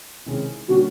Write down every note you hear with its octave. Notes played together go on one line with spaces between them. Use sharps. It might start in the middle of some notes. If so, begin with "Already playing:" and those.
C3 D#3 G#3 C#4 E4
D3 G3 A#3 C#4 F#4